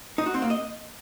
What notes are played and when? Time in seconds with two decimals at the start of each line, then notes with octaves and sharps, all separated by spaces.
0.18 D#4
0.26 F#4
0.34 C4
0.42 A#3
0.50 D#5